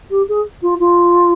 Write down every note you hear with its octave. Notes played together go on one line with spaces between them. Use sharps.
G4
G#4
F4
F4